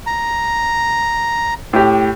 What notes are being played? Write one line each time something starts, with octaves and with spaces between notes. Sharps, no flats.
A#5
A2 G4